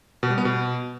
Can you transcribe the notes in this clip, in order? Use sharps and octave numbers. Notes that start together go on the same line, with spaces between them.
B2
G3
B3
B2